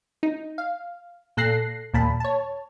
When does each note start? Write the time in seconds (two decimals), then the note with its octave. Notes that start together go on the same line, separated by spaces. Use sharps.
0.23 D#4
0.58 F5
1.37 A#2 A4 F#6 A#6 C7
1.94 D#2 A#2 A5 B5
2.20 C#5 A5